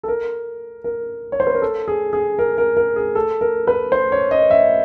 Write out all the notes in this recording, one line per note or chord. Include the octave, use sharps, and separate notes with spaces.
A4
A#4
A#4
C#5
C5
B4
A#4
A4
G#4
G#4
A#4
A#4
A#4
G#4
A4
A#4
B4
C5
C#5
D#5
E5